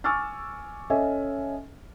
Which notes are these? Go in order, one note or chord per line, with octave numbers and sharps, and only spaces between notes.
G#5 C#6 D6 E6 F6 A6
C#4 A4 D#5 E5 G#5